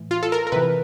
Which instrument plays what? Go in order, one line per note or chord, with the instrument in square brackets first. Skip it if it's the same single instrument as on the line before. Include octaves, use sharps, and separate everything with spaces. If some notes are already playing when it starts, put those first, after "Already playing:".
Already playing: [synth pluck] A2 E3
F4
A4
A#4
A#4
C3 E3 B4